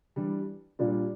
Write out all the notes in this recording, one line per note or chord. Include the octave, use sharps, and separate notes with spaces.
E3 G3 D4
A#2 G3 A#3 D4 F4